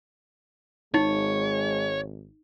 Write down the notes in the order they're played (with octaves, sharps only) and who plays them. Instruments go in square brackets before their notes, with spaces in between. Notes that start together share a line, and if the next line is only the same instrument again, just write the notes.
[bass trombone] G#1 [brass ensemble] G#3 [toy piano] D#4 [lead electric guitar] C#5